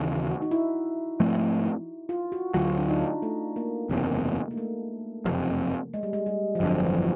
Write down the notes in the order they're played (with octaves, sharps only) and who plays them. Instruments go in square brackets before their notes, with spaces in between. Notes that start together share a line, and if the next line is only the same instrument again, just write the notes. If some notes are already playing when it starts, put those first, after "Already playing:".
Already playing: [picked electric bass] D#2 C#3 E3
[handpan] F#4
D#4
E4
[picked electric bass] G#2 F3 A3 C4
[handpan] F4
F#4
[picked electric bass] D2 D3 F#3 [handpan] F4
[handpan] D4
D#4
A3
A#3
[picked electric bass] F#1 E2 C3 [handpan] A#3
[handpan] G#3
A3
A#3
A3
[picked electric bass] F#1 F2 C3
[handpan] G#3
G3
G#3
G3
F3
[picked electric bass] G1 F2 D3 [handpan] F#3
[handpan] E3
F3